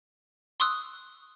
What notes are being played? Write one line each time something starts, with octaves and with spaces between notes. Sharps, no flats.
C6 C#6 D#6 E6 F#6